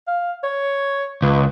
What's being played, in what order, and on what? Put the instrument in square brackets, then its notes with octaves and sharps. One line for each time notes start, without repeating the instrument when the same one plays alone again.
[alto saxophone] F5
C#5
[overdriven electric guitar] C#2 [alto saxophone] B4